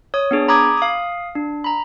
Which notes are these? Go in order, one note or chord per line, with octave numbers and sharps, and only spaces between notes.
C#5 D#6
B3 D4 G#4
A#5 B5 D6 D#6 G#6
F5 D#6
D4
A#5 B5